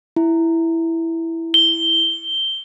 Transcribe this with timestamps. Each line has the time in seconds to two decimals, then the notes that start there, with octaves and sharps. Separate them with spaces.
0.16 E4
1.54 G7